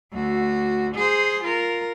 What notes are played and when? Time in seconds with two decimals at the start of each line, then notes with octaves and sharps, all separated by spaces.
0.12 D2 F#4
0.95 G#4 C5
1.44 F4 A#4